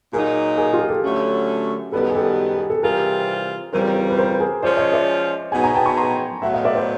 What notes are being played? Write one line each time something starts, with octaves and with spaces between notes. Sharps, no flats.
A#2 F#3 A#3 D#4 G#4 A#4
G#4 A#4
F4 G4
G#4
G4 A4
D3 F#3 A3 C#4
F#2 D#3 G3 B3 A4 B4
G#4
G4 A4
G#4
A4
C3 E3 G3 C4 F4 G#4 A#4
F2 C#3 E3 G3 A#4 C5
B4
A#4 C5
G#4 A#4
F3 G#3 C#4 F4 C5 D5
C#5 D#5
D5 E5
B2 F#3 B3 D#4 G#4 F#5 G#5
G#5 A#5
G5 A5
B5 C#6
A#5 C6
A2 F#3 B3 E5 F#5
D#5 F5
D5 E5
C5 D5